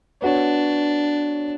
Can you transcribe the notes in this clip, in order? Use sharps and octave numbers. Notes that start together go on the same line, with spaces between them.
B3 D4 F#4 C#5